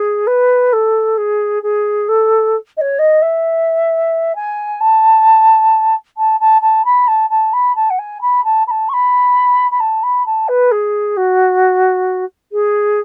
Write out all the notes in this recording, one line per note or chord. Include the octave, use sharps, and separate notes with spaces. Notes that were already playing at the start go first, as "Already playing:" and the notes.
Already playing: G#4
B4
A4
G#4
G#4
A4
D#5
C#5
D#5
E5
G#5
A5
A5
A5
A5
B5
A5
A5
B5
A5
F#5
G#5
B5
A5
B5
A5
C#6
B5
B5
A5
B5
A5
B4
G#4
F#4
G#4